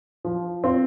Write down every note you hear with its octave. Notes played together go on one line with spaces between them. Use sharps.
F3
C4 F4